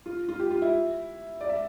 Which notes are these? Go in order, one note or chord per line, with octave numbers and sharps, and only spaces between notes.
F4
F4
G4
F4
E4
D5
E5